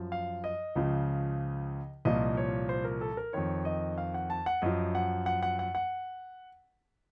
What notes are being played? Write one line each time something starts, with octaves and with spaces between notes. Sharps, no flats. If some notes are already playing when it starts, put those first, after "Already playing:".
Already playing: F#2 F3
F5
D#5
C#2 C#3 F3
C2 A#2 F3 D#5
C#5
C5
A#4
A4
A#4
F2 D#3 C#5
D#5
F5
F#5
A5
F#5
F#2 F3 D#5
F#5
F#5
F#5
F#5
F#5